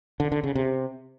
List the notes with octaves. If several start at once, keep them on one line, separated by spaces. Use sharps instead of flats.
D3
D3
C#3
C3